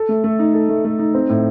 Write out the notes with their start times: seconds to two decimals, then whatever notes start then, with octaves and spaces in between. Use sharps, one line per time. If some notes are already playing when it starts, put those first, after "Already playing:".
Already playing: A4
0.09 A3
0.24 A3
0.39 D#4
0.54 A4
0.69 A3
0.84 A3
0.99 D#4
1.14 C4
1.29 A2